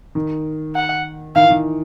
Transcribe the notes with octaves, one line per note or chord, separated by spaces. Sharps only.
D#3
F#5
D#3 F5
E3
D#3